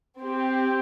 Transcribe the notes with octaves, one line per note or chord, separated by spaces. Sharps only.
C4 G4